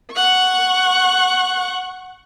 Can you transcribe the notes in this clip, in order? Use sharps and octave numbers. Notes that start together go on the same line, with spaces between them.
F#5 C#6